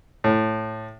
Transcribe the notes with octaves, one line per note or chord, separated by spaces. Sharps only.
A2